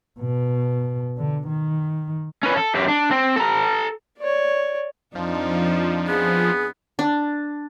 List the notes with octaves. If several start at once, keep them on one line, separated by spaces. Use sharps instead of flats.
B2
D3
D#3
C#4 B4
A4
F#2 G4
D4
C4
A4 A#5
C#5 D5
F2 F3 D4 D#4
B3 G#4
D4